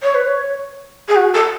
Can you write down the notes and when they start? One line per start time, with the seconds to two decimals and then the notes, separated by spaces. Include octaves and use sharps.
0.02 C#5
0.14 B4
0.26 C#5
1.08 G#4
1.15 F#4
1.34 A4